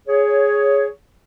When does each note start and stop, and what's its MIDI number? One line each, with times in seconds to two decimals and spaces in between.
0.08 0.87 68
0.08 0.87 73